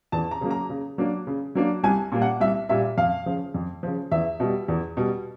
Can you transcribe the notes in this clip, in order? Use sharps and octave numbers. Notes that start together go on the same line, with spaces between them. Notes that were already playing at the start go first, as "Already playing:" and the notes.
E2 A5
A#5
C#3 F#3 A#3
A#5
C#3
F#3 A#3 D4
C#3
F#3 A#3 D4
C2 G#5
A#2 G3 A#3
F#5
C2 E5
A#2 G3 A#3 E5
F2 F5
C#3 F3
F2
C#3 F3
E2 E5
B2 G3
E2
B2 G3